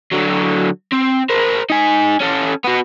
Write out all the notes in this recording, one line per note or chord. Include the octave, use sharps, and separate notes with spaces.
D3 F#3
C4
A#4 C5
D#4 G#5
C#4 A4
B3 F#4